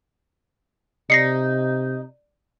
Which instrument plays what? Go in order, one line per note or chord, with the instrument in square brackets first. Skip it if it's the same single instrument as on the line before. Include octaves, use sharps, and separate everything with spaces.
[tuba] C3 [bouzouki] D#4 [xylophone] A#6 C7 C#7